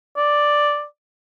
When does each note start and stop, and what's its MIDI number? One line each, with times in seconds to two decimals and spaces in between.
0.17 0.84 74